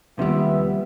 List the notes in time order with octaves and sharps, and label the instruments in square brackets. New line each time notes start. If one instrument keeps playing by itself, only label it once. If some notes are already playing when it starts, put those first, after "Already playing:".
[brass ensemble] D#2 B3 E5 [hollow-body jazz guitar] C3 F3 G3